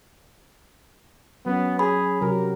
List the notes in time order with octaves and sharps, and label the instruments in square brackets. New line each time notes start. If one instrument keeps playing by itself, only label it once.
[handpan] F#3 C#4 [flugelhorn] B3
[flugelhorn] G#4 [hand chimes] B5
[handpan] C3 F#3 G4 [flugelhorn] A#4